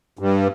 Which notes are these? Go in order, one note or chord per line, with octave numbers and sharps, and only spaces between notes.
G2